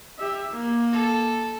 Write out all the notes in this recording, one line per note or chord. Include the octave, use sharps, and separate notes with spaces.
G4 E5
A#3
A4